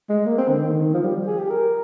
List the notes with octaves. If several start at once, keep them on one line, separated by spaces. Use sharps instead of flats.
G#3
A#3
C4
D3
D#3
F3
G3
G#4
G4
A#4